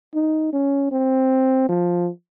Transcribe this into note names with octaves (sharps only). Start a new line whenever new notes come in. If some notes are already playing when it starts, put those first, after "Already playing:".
D#4
C#4
C4
F3